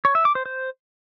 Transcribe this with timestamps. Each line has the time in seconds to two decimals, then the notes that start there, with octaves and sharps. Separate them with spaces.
0.05 C#5
0.15 E5
0.25 D6
0.35 C5
0.46 C5